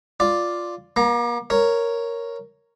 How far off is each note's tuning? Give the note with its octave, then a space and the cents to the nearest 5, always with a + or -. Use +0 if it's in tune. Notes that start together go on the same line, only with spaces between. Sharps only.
F4 +0 D5 +0
A#3 +40 A#5 +0
A#4 +0 C#5 +0